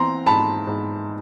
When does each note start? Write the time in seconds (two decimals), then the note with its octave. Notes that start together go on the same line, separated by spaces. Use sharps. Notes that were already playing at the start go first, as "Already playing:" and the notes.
Already playing: E3 C4 A#5 C6
0.26 G#2 A5 B5
0.67 G#2